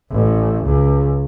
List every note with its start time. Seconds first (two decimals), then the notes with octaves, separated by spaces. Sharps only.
0.12 A1
0.64 C#2